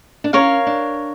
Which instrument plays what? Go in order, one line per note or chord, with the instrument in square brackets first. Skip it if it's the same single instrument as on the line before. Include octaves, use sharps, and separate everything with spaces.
[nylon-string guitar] D4
[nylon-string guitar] C#4 [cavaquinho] A#4 C#5 F5
[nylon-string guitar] D4